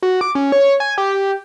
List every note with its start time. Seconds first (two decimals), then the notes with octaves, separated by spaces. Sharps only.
0.03 F#4
0.21 D6
0.35 C#4
0.52 C#5
0.80 G#5
0.98 G4